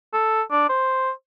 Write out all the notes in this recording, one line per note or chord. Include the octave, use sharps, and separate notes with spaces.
A4
D4
C5